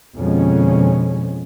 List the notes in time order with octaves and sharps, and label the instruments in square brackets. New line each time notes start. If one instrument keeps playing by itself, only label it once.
[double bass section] F2 B2 D3 F3 G#3 C#4